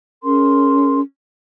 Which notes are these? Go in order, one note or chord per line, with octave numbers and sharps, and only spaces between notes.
C#4 G#4 A#4 C6